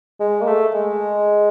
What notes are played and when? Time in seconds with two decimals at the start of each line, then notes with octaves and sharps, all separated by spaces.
0.20 G#3
0.41 A#3
0.47 A3
0.74 G#3